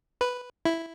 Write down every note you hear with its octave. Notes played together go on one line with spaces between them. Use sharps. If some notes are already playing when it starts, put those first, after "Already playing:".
B4
E4